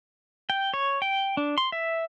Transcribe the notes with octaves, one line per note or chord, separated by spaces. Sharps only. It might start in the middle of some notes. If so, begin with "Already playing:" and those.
G5
C#5
G5
D4
C6
E5